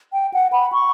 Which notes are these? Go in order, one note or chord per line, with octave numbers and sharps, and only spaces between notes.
G5
F#5
B5
C#6